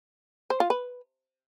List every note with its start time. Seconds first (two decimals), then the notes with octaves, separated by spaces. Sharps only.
0.50 C5
0.60 F4
0.70 B4